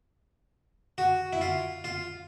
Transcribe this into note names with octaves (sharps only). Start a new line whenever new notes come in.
F#4
E4
F4
F4